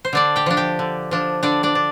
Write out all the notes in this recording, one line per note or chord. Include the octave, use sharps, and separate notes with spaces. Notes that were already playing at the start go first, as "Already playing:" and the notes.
C5
D3 D4 D5
G4 G5
F3 D4
G4 G5
D3
F3 D4
D3 D4 D5
D4 D5
D4